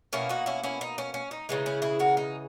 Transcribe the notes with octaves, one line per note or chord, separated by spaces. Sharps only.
B2 A#3 C#4 E4
D#4 F#4
C#4 E4
C#4 E4
D#4
C#4
C#4
D#4
C#3 E3 G#3 D#4
C#4 E4
E4 G#4
F#4 A#4
D#4